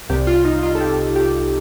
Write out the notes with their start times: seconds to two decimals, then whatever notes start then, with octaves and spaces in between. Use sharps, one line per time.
0.09 C2 C3 G3 G4
0.27 F4
0.45 D#4
0.63 F4
0.75 A4
0.80 G4
1.16 G4